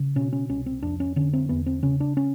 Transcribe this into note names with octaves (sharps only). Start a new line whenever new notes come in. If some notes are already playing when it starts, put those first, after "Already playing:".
Already playing: C#3
B2 C#4
C#4
C2 C#4
C4
F2 D4
C#4
D3 C#4
C4
E2 B3
C4
C#3 C#4
D4
C#4